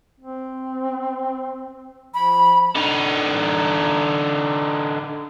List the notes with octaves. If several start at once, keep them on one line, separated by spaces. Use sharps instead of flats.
C4
F3 B5
D3 D#4